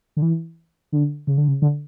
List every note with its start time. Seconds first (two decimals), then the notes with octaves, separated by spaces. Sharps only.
0.17 D3
0.22 E3
0.92 D3
1.27 C#3
1.38 D3
1.48 C#3
1.62 D3